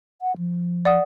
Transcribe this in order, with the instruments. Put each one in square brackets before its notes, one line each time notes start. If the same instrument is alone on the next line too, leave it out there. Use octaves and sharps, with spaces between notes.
[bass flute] F#5
F3
[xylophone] D5 F#5 D#6